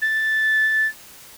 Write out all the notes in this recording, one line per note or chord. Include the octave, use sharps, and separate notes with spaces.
A6